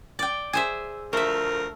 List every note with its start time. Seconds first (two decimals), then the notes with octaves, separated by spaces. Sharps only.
0.19 D5 G5
0.53 G#4 C5 E5
1.13 D2 F3 A3 A#4 E5